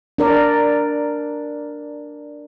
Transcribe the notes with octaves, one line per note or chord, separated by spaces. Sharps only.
D4 A#4 D5